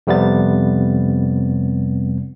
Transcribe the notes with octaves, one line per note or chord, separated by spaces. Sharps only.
F2 C3 G3 B3 A6